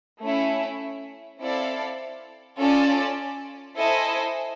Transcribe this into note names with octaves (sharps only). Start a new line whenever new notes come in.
A3 C#4 E4
C4 E4 A4 D5 F5
C#4 F4 A4 D5
E4 A4 C5 D#5 G#5